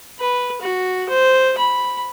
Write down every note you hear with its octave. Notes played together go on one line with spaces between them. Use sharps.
B4
F#4
C5
B5